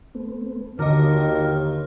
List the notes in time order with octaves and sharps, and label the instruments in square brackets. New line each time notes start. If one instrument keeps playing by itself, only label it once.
[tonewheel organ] A3 B3 C4
[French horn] D#2 [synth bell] D3 D#5 [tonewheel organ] D#4 F#4 C#5 [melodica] A#4